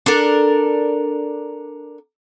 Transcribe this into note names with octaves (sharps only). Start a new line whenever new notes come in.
D4 A4 A#4